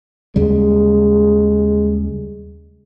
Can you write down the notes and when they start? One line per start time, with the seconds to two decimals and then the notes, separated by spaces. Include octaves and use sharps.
0.36 D#2 C#3 G3 G#3